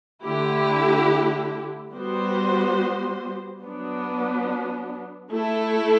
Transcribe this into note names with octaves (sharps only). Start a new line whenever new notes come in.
D3 A3 E4 G4
G3 B3 F#4 C5
F#3 B3 D4
A3 E4 A4